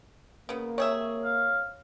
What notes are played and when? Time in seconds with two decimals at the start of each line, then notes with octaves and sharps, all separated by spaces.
0.49 C#3 A#3 B3
0.78 C3 G#4 C#5 E5
1.25 F5